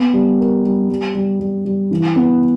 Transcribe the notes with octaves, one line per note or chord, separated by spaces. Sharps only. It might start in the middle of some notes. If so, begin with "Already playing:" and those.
Already playing: B3
G3
A#4
G3
G3
G3
G3
G3
E3
B3